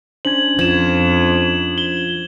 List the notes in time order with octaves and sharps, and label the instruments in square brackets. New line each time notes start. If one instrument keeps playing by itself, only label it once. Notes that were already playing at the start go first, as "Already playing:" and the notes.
[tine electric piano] C#4 D4 C5 [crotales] G#6 F#7
[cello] F2 [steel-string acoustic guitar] F3 [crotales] G#6 E7
[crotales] G7